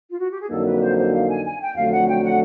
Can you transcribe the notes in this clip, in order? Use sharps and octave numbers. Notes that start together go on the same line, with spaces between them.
F4
F#4
G4
G#4
F2 D3 F#3 A#3 D#4 A4
B4
C5
C5
F5
G#5
G#5
G5
F2 D3 F#3 A3 F5
F#5
G5
F#5